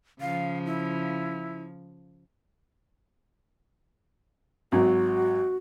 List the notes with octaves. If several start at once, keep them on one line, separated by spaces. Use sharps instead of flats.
C#3 F3 F5
E4
G#1 F#3 F#4